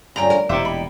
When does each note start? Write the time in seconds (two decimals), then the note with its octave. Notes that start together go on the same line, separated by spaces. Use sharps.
0.16 D2 G2 D3 F3 C#4 G5 A#5
0.30 A#4
0.49 E1 A#2 D#4 E4 G4 C5 E5 D6
0.65 B5